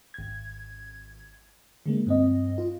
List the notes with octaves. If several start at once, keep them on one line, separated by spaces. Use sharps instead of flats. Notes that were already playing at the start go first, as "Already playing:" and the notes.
G#1 G#6
D3 G#3 A#3
G2 C4 D#5
F4